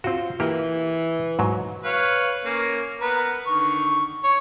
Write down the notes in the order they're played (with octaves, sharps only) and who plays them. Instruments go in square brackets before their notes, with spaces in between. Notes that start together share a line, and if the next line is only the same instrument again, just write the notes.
[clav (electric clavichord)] C4 F#4 [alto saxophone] F4
[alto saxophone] E3 [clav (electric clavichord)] A#3 G4
[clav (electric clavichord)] G#2 F#3
[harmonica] B4 C#5 F5
A#3 C#4
B3 A#4 B4
D3 D#3 C#6
C#5 C#6